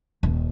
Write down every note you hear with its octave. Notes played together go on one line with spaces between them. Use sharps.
D#1